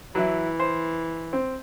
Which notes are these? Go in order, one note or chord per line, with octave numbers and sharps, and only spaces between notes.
E3 F#3 E4
C5
C4